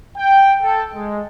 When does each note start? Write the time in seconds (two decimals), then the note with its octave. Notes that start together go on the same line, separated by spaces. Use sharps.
0.17 G5
0.62 A4
0.94 G#3